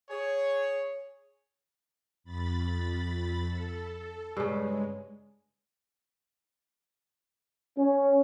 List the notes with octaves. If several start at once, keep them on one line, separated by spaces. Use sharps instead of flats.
G#4 C#5
F2 B5 A6
A4
G2 C#3 G#3
C#4